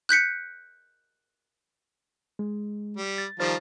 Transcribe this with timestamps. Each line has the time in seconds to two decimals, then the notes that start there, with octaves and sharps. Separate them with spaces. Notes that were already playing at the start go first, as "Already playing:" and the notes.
0.09 F#6 G6 B6 C#7
2.39 G#3
2.97 G3
3.18 A6
3.40 D#3 F3 G3 C5 F6 A6